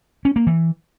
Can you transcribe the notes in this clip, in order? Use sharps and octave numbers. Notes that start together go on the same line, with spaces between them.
C#4
A#3
E3